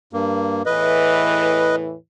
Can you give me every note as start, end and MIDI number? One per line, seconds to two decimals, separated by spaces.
0.13 0.63 43
0.13 0.63 58
0.66 1.94 40
0.66 1.94 45
0.66 1.94 52
0.66 1.76 71
0.66 1.76 75